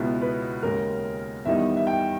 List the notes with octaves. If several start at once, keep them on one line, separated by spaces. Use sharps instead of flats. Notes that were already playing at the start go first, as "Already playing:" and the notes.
Already playing: C#2 B2 G#3 B3 E4
B4
D#2 C#3 G#3 A#4
E2 D#3 G3 B3 D#4 E5
E5
G5